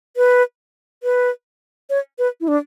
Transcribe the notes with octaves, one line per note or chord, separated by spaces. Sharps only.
B4
B4
C#5
B4
E4
D4